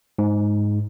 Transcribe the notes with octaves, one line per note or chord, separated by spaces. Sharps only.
G#2